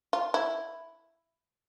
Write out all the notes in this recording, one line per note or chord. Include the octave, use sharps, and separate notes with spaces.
F4
E4